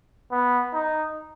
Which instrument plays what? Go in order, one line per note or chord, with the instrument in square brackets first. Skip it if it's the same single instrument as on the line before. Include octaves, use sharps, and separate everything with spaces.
[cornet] B3
D#4